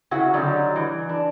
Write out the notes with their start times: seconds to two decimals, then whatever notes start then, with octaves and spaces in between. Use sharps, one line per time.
0.11 C#3 C#4 E4 F#4 F#5
0.34 D3 F#3 G3 D#4 A#5
0.76 E3
1.09 D4